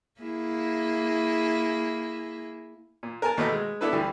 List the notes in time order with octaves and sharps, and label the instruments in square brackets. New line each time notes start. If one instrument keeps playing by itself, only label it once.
[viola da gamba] A#3 E4 G#4
[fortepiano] A#2
A#4 G#5 A5
D#2 B2 A3 B3 D#5 B5
G#3
B3 D4 E4 A4 B4
D2 E3 G3 G4